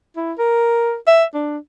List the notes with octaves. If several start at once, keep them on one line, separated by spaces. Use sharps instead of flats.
E4
A#4
E5
D4